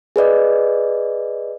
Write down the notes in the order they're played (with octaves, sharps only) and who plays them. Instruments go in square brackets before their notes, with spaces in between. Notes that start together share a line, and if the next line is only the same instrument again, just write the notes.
[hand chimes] G#4 B4 D5 D#5